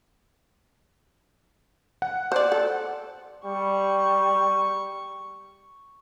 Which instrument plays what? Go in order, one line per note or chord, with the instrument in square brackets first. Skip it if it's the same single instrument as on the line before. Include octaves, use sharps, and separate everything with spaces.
[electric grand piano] F#5
[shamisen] C5 D5
A4
[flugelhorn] G3 [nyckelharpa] C#6